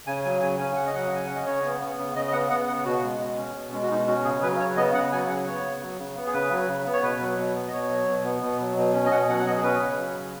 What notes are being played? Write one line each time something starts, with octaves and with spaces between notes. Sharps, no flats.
C#3 G#5
F#3 G#5
C#3 G#5
C#4 G#5
C#3 F#5
D#5
F#3 F#5
C#3 G#5
C#4 F#5
D#5
C#3 C#5
B3
B3
C#3
C#3 D#5
D#5
B3 F#5
B3 F#5
C#3 F#5
B2 F#4
G#3
B2
C#4
B2
G#3 C#4
F#4
B2 D#4
C#4 F#4
C#3 G#4
F#3 B4
C#3 C#5
B3 D#5
C#3 F#5
F#3 G#5
C#3 F#5
B3 C#5
C#3
F#3
C#3
B3
G#4
C#3 B4
F#3
C#3
B3
C#5
B2 B4
F#3
B2
B3
D#5
B2 C#5
F#3
B2
B3
B2
F#3
B2
C#4
D#5
B2 F#5
F#3 F#5
F#5
B2 D#5
G#4
C#4 B4
C#3
F#3
C#3